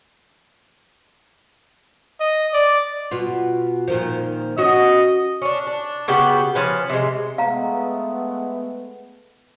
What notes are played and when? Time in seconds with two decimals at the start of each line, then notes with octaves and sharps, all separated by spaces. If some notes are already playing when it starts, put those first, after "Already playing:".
2.20 D#5
2.53 D5
3.11 B2 F4
3.88 A#2 D#3 F3
4.58 C#4 F#4 D#5
5.42 C#4 D4
5.67 D4
6.08 C#3 B3 F#4 G4
6.55 F3 C#4 B4
6.89 C3 G#3
7.38 G#3 A3 B3 F5 A#5